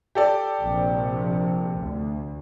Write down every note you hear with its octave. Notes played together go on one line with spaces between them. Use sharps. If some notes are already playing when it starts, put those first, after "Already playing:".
G4 A4 D5
A#1 C3 F3
D2